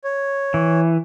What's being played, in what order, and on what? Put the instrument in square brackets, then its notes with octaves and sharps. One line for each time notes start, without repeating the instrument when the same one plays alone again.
[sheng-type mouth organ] C#5
[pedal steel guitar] E3